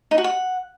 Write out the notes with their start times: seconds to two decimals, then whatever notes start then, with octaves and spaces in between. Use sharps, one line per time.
0.11 D#4
0.18 F#4
0.24 F#5